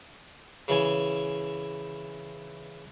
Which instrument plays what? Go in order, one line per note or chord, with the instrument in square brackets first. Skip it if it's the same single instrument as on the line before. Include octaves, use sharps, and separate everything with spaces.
[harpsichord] C#3 E3 G#5